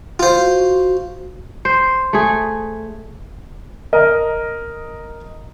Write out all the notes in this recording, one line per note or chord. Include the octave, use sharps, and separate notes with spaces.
F4 C5
F#4
C5
A3 G#4
A#4 D#5